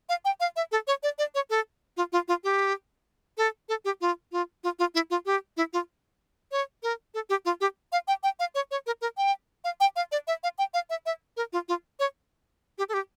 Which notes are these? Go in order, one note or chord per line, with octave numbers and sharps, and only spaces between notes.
F5
G5
F5
E5
A4
C#5
D5
D5
C#5
A4
F4
F4
F4
G4
A4
A4
G4
F4
F4
F4
F4
E4
F4
G4
E4
F4
C#5
A#4
A4
G4
F4
G4
F5
G5
G5
F5
C#5
C#5
A#4
A#4
G5
F5
G5
F5
D5
E5
F5
G5
F5
E5
E5
A#4
F4
F4
C#5
G4
A4
G4